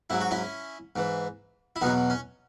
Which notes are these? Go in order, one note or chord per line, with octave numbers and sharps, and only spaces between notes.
G#2 F#3 E4
F#4
C#4 E4
G#2 E3
E4
E2 B2 F#3 B3 D#4
C#4